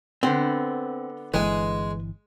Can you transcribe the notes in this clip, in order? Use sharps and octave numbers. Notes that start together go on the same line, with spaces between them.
D3 B3 C4 C5
G1 E3 G#3 B4 G#5